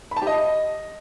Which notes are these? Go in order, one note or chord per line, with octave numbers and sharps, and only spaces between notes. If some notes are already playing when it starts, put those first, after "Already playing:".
B5
A5
G4
D#5